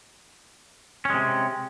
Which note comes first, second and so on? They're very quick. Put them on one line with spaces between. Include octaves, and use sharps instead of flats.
C#4 G#3 C3